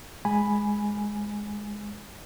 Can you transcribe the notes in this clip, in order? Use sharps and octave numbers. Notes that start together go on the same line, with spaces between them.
G#3 G#5 B5